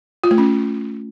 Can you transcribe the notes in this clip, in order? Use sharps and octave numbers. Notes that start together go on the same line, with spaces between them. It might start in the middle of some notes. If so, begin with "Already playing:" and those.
F4
A3
C#4